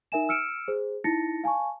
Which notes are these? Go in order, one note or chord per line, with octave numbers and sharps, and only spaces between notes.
D#4 A#4 E5 G#5 E7
E6 F6 C#7 D7 E7
G#4 C5
D#4 E4 A5 A6 A#6 C#7
F5 G#5 A5 C#6